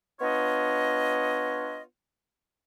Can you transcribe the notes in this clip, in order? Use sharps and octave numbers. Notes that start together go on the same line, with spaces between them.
B3 D4 F4 C#5 D#5